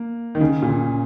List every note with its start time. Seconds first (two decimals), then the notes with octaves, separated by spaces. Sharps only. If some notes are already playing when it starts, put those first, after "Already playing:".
Already playing: A#3
0.35 D#3
0.40 C#3
0.62 A#2
0.68 C#3